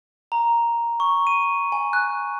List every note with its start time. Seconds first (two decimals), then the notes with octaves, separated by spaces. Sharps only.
0.32 A#5
1.00 C#6
1.27 D#7
1.72 G#5
1.93 F#6